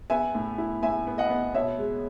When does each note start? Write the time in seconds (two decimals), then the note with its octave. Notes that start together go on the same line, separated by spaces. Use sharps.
0.10 B3 E5 G#5
0.35 A2
0.58 E4
0.83 A2 E5 G#5
1.07 B3
1.18 D#5 F#5
1.30 B3
1.54 B2 C#5 E5
1.78 G#3